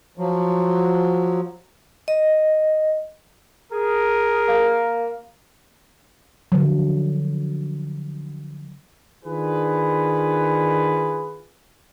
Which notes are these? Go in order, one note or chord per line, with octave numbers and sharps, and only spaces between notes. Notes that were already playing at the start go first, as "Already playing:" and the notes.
F3 F#3
D#5
G#4 A#4
A#3
D3 F3 F#3
D#3 D4 F4 G#4 B4